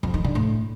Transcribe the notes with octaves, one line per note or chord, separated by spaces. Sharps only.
F2
D#3
D3
A2